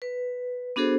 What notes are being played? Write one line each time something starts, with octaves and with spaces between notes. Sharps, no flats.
B4
B3 D4 F#4 G#4 A4 C5